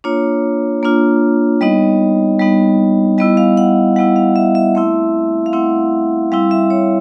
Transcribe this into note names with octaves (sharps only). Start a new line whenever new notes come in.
A#3 D4 F4 C#5
A#3 D4 F4
G3 B3 D#4 D#5
G3 B3 D#4
G3 B3 E4 D#5
F5
F#5
G3 B3 E4 F#5
F5
E5
E5
A3 C4 E4 E5
F5
A3 C4 E4 F#5
G3 C4 E4 F5
E5
C#5